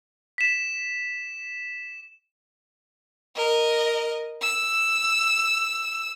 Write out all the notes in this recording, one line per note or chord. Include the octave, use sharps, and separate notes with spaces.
B6 E7
A#4 D#5
E6